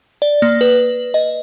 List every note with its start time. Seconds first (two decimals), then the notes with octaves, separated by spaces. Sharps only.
0.22 D5
0.42 A#3
0.61 B4
1.14 D#5